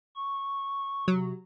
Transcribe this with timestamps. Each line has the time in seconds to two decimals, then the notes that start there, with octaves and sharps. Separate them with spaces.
0.16 C#6
1.08 C3 F#3